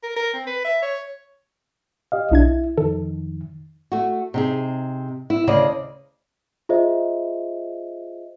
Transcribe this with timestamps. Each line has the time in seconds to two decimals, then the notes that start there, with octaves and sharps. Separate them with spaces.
0.03 A#4
0.16 A#4
0.34 C4
0.47 B4
0.65 E5
0.82 C#5
2.12 G4 D#5 F5
2.31 B1 D4 E4 G#6
2.78 F2 D#3 A4
3.92 A3 F#4
4.34 C3 D#4 G#4
5.30 E4
5.47 D2 C#3 D5 D#5
6.69 F4 G#4 C5 D#5 E5